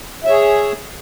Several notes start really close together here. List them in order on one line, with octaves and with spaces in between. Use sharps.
E5 C#5 G#4